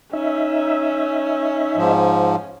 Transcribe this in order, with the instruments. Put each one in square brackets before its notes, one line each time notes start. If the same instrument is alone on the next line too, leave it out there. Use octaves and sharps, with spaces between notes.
[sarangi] C#4 [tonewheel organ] D#4 E5
[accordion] G#2 F3